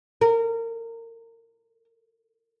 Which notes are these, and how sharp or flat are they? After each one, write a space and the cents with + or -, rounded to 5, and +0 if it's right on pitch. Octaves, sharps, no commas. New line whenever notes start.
A#4 -25